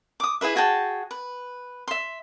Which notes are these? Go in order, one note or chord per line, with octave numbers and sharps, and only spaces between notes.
D6 D#6
E4 G#4 B4 E5
F#4 G#4 G5 A5
B4
E5 C6